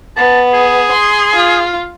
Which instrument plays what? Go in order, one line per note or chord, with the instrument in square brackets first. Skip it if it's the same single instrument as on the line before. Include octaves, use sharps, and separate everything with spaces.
[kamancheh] B3 [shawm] A5
[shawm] G#4
[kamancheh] C6
F4